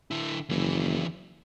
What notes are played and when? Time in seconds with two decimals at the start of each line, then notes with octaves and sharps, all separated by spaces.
0.11 D3 E4
0.49 F#1 D#2 E3